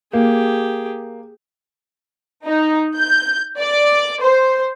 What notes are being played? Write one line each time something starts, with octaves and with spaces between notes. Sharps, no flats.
A#3 G4 G#4
D#4
G6
D5
C5